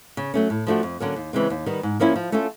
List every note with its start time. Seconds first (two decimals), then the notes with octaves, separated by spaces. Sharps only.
0.17 C#3
0.34 F#3 A3 C#4
0.50 A2
0.67 F3 A3 D4 F#4
0.83 F2
1.00 D3 F#3 A#3 C#4
1.16 D#2
1.33 C#3 E3 G#3 C4
1.50 D#2
1.66 D#3 G3 B3
1.83 G#2
2.00 F3 A#3 C#4 E4
2.16 F3
2.32 A3 C#4 F4 A4